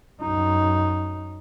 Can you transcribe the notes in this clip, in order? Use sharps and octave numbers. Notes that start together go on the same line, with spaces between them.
F#2 D#4